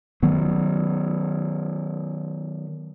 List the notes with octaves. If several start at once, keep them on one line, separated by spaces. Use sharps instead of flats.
D#3 F#3 B3